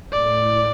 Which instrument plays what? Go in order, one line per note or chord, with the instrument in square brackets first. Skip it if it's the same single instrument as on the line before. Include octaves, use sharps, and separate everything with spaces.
[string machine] A2 [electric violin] D5